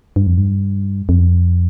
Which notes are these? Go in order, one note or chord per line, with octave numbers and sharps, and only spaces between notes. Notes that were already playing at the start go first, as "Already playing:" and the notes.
G2
F2
G2
F2